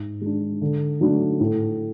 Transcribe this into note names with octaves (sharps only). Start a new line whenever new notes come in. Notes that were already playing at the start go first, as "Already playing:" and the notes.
Already playing: G#2
G#3 D4
D3
F#3 A3 D4
A2